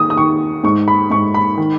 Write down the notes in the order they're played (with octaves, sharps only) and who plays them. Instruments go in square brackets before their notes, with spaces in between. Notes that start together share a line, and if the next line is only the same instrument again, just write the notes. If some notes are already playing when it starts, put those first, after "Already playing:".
Already playing: [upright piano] D#3 D#6
D#6
D#3 C#6
G#2 C#6
B5
G#2 C#6
B5
D#3